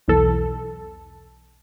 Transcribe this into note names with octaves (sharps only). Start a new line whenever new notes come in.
B1 E2 A4